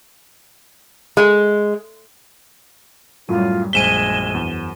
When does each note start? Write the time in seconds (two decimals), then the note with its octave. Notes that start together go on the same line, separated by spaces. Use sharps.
1.17 G#3
3.29 F#2 A2 F#3 G3 F4 D#7
3.73 A#1 F#2 G#3 C5 B6 D#7 E7 G7
4.35 E2